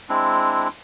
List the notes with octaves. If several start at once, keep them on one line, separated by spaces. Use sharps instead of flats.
G#3 C4 D4 E4